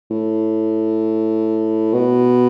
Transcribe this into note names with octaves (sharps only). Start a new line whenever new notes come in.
A2
B2